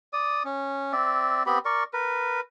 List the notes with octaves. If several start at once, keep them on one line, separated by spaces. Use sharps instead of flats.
D5 D#6
C#4
C4 D5 E5
B3 C4 G4 B5
A#4 D5 C#6
A#4 B4